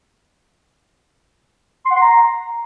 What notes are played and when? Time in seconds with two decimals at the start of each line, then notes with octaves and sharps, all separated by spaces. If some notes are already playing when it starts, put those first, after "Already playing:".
1.85 C6
1.91 F#5
1.96 C6
2.02 A#5